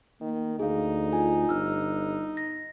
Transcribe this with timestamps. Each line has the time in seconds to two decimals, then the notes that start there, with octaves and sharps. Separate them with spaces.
0.21 D#3 A#3
0.59 D2 D#4 G#4 F5
1.12 F4 G#5
1.49 G1 E6 F6
2.37 A#6